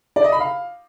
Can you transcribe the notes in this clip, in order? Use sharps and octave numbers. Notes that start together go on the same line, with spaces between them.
D5
D#5
B5
F5